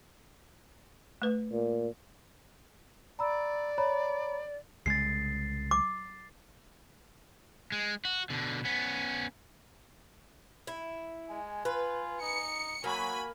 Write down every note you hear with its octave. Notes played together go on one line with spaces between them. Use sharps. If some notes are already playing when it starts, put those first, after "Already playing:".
A3 B4
A#2
D5 A#5 B5 E6
C#5 A#5 B5
C2 C#3 G#3 A6 C7
D6
G#3
F#4
B2 D3
B3 C#4
E4
G#3 G#5
F4 B4
D#4 C#7
F#3 A#3 F#4 G#5 B5